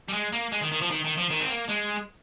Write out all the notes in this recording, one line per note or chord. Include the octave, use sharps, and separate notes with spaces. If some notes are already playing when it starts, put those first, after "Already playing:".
G3
G#3
A#3
G#3
D#3
D#3
F3
D#3
D#3
F3
D#3
C4
A#3
G#3